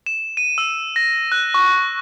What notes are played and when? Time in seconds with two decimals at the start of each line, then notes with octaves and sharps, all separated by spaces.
0.06 E7
0.37 D#7
0.58 E6
0.96 A#6
1.32 F#6
1.54 C#6